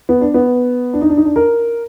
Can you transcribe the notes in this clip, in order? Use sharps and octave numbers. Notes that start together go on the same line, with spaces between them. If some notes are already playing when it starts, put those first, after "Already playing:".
B3
D4
B3
D4
D#4
D4
D#4
D4
A#4